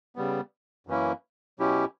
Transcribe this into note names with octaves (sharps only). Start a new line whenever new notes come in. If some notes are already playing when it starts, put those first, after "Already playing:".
C#3 G3 B3
F#2 E3 A#3 C#4 E4
B2 F#3 C#4 E4 G4